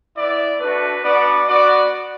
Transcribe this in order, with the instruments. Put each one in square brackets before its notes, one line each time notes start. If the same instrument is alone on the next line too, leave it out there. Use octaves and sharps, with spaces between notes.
[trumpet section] B3 E4 D5
A3 D4 F#4 B4
B3 D4 F#4 D5
B3 F#4 D5